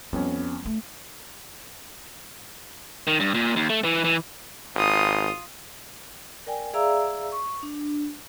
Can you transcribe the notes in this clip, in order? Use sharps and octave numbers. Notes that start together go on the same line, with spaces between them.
F2 G3 B3 C#4
A3
D#3
G2
A#2
D#2
A3
E3
E3
G#1 F4 D#6
A#4 D5 G5 G#5
G#4 D5 E5 F5 A#5 E6
C#6
D4